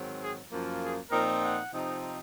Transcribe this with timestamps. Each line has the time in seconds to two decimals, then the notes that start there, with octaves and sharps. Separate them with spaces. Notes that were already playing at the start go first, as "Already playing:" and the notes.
Already playing: G#2 D#3 F#3 C4
0.21 G#4
0.52 F#2 F3 A#3
0.82 G#4
1.11 A#2 F3 C4 D#4 A#4
1.42 F#5
1.72 C3 F3 C4 D#4